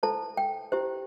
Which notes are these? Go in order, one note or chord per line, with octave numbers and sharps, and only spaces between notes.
E4 A4 C5 A5
G5
E4 G4 C5